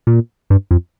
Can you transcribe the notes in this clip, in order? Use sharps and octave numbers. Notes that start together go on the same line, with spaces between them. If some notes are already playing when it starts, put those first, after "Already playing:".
A#2
G2
F2